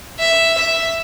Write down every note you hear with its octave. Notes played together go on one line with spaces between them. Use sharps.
E5
E5